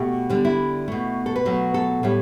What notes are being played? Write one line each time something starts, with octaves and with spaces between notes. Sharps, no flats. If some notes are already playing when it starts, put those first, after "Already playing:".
Already playing: B2 A3 G4
D3 G3
E4
B2 A3
A4
B4
B2 F#3 A3
A4
A2 G3